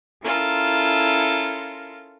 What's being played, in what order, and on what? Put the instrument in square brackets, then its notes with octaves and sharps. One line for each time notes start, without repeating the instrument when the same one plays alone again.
[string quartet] C#4 E4 F4 A4 A#4